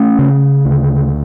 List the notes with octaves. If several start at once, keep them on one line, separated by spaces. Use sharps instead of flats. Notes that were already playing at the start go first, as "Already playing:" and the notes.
Already playing: A3 C#4
C#3
D2